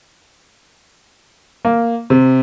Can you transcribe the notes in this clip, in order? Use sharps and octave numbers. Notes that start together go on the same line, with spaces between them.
A#3
C3